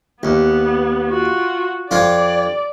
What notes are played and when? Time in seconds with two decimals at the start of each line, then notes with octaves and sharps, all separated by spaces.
0.23 D#2 B3
1.09 F4 F#4
1.91 F2 F4 D5